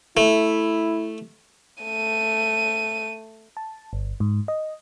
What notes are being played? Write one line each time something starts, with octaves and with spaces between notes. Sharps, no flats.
A3 E4
A3 D#7
A5
G1
G#2
D#5